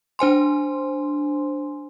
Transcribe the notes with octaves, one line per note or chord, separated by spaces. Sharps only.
D4 C5 G#5 C6